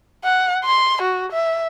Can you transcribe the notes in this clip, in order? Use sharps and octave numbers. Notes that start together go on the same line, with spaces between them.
F#5
C6
F#4
E5